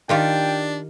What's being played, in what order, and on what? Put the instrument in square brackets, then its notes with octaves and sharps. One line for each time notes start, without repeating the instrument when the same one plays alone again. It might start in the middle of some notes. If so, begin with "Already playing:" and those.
[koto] D#3 F4 G4 [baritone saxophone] D4 [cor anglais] G5